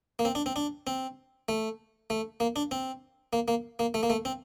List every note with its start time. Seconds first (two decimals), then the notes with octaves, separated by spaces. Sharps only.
0.19 A#3
0.25 C4
0.35 D4
0.46 C4
0.56 D4
0.87 C4
1.48 A3
2.10 A3
2.40 A#3
2.56 D4
2.71 C4
3.33 A#3
3.48 A#3
3.79 A#3
3.94 A3
4.03 A#3
4.10 A3
4.25 C4